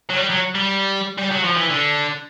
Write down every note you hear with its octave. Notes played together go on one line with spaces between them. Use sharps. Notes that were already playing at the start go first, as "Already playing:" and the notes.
F#3
G3
F#3
G3
G3
F#3
F3
E3
D3